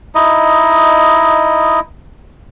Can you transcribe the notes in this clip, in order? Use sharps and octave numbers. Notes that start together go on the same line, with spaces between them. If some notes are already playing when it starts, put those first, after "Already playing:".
D#4 E4 D#5